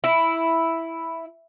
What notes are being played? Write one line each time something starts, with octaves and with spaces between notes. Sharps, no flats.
E4